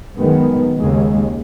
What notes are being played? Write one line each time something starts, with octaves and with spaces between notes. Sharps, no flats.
F#2 D#3 G#3 B3
D#2 C#3 G#3